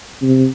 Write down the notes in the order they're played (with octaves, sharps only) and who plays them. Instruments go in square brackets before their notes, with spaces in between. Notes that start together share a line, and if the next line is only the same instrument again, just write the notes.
[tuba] C3